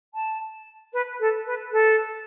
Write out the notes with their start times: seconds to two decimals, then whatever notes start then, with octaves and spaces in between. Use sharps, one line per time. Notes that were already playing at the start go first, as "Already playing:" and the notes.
0.14 A5
0.93 B4
1.19 A4
1.46 B4
1.72 A4